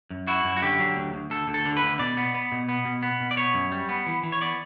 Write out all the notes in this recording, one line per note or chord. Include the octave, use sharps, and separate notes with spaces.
F#2
E4 F#4
F#2
F#4
D3 G4
F#3
D2
D2
D2 A4
D2
A4
D3
B4
D2
B2 D5
B3
B3
B2
B3
B2
B3
B2
D5
B3 C#5
F#2
G3
B3
E3
E3
C#5
B3 D5